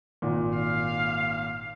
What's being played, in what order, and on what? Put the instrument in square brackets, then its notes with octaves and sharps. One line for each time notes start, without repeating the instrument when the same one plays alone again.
[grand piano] G#1 A#2
[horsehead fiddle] F5